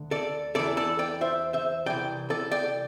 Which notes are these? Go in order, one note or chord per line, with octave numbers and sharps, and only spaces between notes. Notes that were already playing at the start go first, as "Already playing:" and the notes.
Already playing: D2 D3
A4 D5
E2 E3 A4 D5
A4 D5
D5 G5
C5 E5
C5 E5
C2 C3 E3 D5 G5
A4 D5
D5 G5